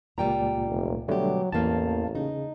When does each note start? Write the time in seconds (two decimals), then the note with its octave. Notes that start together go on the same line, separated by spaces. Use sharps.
0.18 C#2 A#2 G3 G5 A#5
0.67 F1
1.08 B2 D3 F#3 G3 A3 G4
1.52 A1 E2 A#3 F5 A5
2.15 C#3 D#4